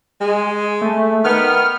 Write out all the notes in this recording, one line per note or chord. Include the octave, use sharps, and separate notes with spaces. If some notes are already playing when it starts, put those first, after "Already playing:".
G#3
A3
D#3 B3 F6